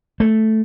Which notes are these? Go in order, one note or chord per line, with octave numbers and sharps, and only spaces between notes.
A3